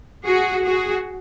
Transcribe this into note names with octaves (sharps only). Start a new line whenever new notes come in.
F#4 G#4
F#4 G#4